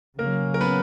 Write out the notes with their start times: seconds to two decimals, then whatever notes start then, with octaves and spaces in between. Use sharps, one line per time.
0.19 C#3 F#3 A#3 C#4 A#4
0.54 A#4
0.61 B3 B4